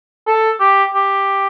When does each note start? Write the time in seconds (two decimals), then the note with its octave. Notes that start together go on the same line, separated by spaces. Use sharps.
0.27 A4
0.60 G4
0.95 G4